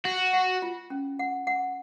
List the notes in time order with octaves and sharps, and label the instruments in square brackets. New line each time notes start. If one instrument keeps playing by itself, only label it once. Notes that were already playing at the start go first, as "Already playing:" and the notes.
[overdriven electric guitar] F#4 [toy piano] F#5
[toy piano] F#5
F4
C#4
F#5
F#5